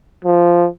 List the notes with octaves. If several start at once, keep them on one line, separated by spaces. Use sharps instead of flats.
F3